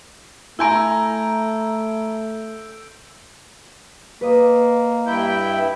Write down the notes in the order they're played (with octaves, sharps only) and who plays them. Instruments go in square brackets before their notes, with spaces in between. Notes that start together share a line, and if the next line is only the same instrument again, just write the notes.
[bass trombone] A3 [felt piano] E4 G#5 A#5 [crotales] E6 G6 D7
[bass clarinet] A#3 [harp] B4 D#5
[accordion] G2 E4 G5